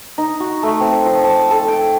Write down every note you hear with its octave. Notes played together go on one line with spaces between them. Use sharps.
D#4
F#4
A3
C4
F3
A5
A4
G5